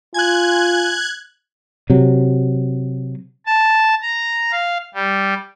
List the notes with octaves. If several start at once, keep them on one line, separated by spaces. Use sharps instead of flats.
F4 G#5 F#6 G#6
C3 F#3
A5
A#5
F5
G3